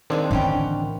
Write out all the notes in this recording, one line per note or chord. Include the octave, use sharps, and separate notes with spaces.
D#3 F3 G#3 C4 D4 D#4
A2 D3 E3 B3 C#4 G5